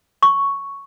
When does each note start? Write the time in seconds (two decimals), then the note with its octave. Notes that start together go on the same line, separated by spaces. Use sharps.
0.23 C#6